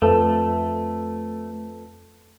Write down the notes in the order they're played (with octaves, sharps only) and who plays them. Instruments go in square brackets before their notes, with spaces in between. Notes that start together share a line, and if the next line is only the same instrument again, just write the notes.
[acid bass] F2 [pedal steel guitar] A3 [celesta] A4 B4 A5